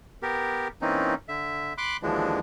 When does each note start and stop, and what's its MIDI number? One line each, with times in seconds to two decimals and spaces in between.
0.22 0.68 59
0.22 0.68 67
0.22 0.68 70
0.82 1.14 52
0.82 1.14 58
0.82 1.14 60
0.82 1.14 61
0.82 1.14 63
1.28 1.73 50
1.28 1.73 76
1.78 1.97 83
1.78 1.97 84
1.78 1.97 86
1.78 1.97 90
2.02 2.39 39
2.02 2.39 50
2.02 2.39 52
2.02 2.39 53
2.02 2.39 56
2.02 2.39 62